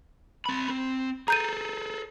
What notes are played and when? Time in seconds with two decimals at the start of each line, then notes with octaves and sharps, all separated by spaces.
0.46 C4 B5
0.69 C4
1.28 G#4 A4 A#5 G6 D#7